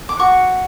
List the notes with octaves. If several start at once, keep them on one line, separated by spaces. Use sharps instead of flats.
D6
F#4 C#6